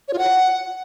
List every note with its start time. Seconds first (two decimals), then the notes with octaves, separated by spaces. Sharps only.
0.08 C#5
0.13 F4
0.18 F#5